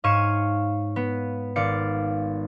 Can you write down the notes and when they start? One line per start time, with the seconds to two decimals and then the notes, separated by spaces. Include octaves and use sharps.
0.04 G#2 C#5 F5 C#6 D#7 E7
0.96 B3
1.56 G#1 D5 F5 C#7